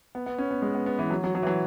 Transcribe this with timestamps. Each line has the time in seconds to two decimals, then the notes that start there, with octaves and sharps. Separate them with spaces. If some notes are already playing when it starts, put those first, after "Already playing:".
0.15 B3
0.26 B3
0.38 C#4
0.51 B3
0.62 G#3
0.75 B3
0.86 B3
0.99 E3
1.11 F#3
1.24 F#3
1.35 F#3
1.43 E3
1.47 F#3